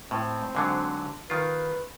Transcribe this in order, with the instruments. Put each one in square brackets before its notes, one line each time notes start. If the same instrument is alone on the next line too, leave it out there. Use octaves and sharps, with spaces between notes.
[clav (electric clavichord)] A2 [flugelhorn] C4
[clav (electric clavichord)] G#2 D3 F#3
[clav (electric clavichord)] D#3 F4 [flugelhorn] B4